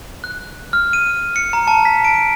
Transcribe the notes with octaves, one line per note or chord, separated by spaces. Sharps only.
F#6
F6
D#7
C#7
A#5
A5
B6
D7